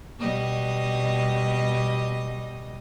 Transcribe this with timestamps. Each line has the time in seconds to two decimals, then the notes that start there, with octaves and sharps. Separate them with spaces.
0.19 B2 G3 D#5